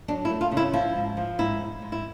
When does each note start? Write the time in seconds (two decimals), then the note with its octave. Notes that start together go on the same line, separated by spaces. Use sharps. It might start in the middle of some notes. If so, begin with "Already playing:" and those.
0.08 F#3 D4
0.25 E4
0.30 A3
0.41 F4
0.52 C#3
0.57 E4
0.73 F3 E4
0.95 G#2
1.17 F3
1.39 G#2 E4
1.60 G#3
1.82 G#2
1.92 E4